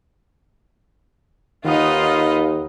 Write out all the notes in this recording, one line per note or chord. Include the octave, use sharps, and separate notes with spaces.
D#2 D#3 D#4 F4 B4 D#5 F#5 D#6